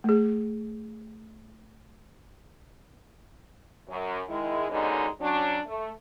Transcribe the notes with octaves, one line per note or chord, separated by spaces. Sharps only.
A3 G#4
F#2
D#3 G#3 E4
D#2 B2 D3 G#3 C#4 D#4
F#3 C#4 D4
A3